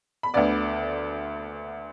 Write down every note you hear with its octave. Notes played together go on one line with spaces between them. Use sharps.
B5
D2 D3 B3 D5 D6